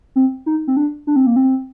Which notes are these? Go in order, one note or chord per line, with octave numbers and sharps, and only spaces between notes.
C4
D#4
C4
D4
D4
C4
A#3
C4